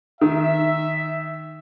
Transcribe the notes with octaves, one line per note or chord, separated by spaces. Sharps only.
D#3 E5